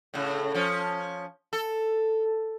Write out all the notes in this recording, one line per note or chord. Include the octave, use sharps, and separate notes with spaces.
A2 C#3
F3 C#4
A4